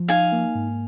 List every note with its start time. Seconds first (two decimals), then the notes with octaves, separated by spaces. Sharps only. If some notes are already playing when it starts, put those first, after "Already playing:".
Already playing: F3
0.08 D#4 F5 G#5
0.32 A#3
0.55 G#2